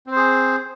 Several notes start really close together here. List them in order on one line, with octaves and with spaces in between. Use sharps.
C4 C5 G#4